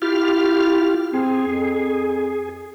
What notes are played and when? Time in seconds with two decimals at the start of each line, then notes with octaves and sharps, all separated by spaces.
0.02 E4 F4 G4 F6
1.13 C4 G#4
1.47 F2